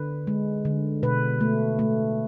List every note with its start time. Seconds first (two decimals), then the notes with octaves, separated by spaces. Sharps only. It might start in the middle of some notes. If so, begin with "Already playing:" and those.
Already playing: D3 B4
0.27 G#3
0.65 D3
1.03 B2 B4
1.41 A3
1.79 A3